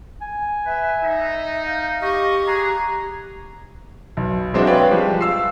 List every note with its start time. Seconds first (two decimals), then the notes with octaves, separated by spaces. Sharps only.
0.22 G#5
0.66 B4 E5
1.03 D#4
1.66 F5 G6
2.02 G4 D#5 C#6
2.47 G#4 A#5 F#6
4.17 B1
4.54 F#3 G#3 C4 D4 E4 F#4
4.67 B4 C#5 D5 F5 G5 F#6
4.91 F3 G3 G#3
5.21 F5 E6 C7